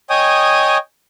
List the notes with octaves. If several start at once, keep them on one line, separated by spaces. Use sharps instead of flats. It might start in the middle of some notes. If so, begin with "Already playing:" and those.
C#5 D#5 G5 G#5 D#6